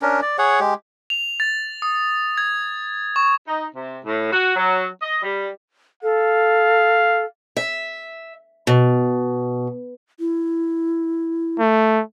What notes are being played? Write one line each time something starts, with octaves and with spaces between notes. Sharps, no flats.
C#4 D4 A#4
D5
G#4 C#5 F#5
G#3 G4
F7
A6
D#6
G#6
C#6
D#4
C3
A2
F#4
F#3
D#5
G3
A4 F5
E5
B2
E4
A3